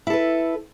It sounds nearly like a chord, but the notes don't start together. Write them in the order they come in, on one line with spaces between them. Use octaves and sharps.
E4 A4 B4